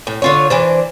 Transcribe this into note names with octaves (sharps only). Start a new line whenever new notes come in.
A2
D3 F4 C#5
E3 D4 C5